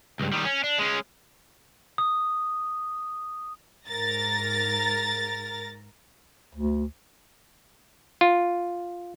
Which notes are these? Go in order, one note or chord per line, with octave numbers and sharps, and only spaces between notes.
C#2 G2
D#3 G3
C#4
D4
G#3 C#4
D#6
G#2 A#4 A6 A#6
D2
F4